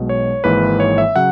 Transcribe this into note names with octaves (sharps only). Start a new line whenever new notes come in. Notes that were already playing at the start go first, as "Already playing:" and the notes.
Already playing: B1 B2 G#3
C#5
G#1 G#2 E3 A#3 B4
C#5
E5
C#3 F#3 F#5